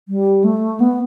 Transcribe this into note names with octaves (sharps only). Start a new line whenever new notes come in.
G3
A3
B3